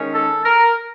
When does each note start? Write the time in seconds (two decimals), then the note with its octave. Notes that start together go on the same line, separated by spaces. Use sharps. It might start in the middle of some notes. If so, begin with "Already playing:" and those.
Already playing: D#3 G#3 C#4
0.13 A4
0.45 A#4